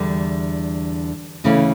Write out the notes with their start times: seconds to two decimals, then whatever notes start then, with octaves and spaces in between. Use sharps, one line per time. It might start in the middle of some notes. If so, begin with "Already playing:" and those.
Already playing: E2 D3 G3
1.44 D2 C#3 E3 A3 C#4